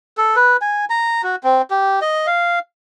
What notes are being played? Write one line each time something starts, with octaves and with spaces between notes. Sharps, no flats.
A4
B4
G#5
A#5
F#4
C4
G4
D#5
F5